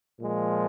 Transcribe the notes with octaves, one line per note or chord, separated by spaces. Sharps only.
A#2 F3 G#3